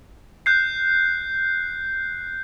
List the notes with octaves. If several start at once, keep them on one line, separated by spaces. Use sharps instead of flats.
F#6 G6 C7